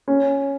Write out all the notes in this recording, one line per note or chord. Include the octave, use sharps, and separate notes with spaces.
C#4